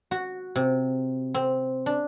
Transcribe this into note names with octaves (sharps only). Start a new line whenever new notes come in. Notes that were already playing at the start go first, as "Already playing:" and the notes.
F#4
C3
C4
D4